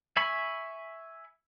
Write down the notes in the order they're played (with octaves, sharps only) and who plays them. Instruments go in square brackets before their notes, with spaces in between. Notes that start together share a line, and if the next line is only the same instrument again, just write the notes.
[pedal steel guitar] E5 G#5 B5 C#6